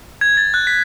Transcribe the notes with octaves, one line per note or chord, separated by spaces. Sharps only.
G#6
A6
F#6
B6